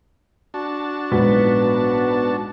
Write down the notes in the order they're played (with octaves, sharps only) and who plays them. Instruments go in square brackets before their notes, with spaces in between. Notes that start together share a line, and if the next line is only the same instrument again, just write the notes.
[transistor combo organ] D4 F#4 A5
[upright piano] A#1 G#2 F#3 [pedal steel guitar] B3